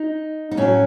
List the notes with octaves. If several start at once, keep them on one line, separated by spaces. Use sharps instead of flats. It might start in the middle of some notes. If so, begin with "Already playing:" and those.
Already playing: D#4
D#4
A2 F#3 C#4